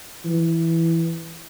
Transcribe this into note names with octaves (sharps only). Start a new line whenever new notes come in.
E3